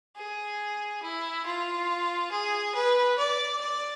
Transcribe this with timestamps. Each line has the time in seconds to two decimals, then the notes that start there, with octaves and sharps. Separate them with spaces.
0.16 G#4
1.02 E4
1.46 F4
2.31 G#4
2.75 B4
3.18 D5
3.60 D5